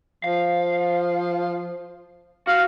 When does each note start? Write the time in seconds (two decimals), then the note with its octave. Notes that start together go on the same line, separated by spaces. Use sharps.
0.24 F3 F5
2.47 F#4 F5